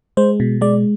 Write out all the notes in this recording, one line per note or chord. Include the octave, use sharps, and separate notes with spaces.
G#3 C5
B2
G#3 D5